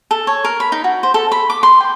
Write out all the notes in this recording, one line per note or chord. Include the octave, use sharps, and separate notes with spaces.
A4
C#5
A#4
B5
D#4
F#4
C5
A4
B5
D6
C6
G5